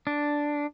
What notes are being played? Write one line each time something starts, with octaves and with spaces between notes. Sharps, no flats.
D4